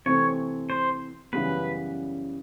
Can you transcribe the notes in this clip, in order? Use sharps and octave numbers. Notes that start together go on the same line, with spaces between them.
C3 E3 A3 C4 C#5
C5
F#2 C#3 E3 G3 B3 B4